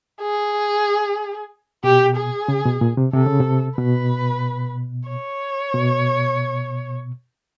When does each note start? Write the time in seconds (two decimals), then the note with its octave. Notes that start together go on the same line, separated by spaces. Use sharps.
0.21 G#4
1.83 B2 G4
2.17 G#4
2.48 C#3
2.65 B2
2.81 A#2
2.97 C3
3.13 C3 A4
3.27 C#3
3.41 C3
3.78 B2 B4
5.09 C#5
5.74 B2